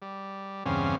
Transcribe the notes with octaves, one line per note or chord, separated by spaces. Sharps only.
G3
E2 G2 C#3 C4 C#4 F5